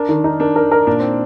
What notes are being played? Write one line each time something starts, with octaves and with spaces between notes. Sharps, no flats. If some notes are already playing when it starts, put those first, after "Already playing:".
Already playing: D4 A#4
D#3
D#4
D4 A#4
A#4
A#4
A#2 D4
C4